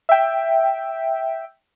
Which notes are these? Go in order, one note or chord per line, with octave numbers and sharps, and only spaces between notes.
E5 G5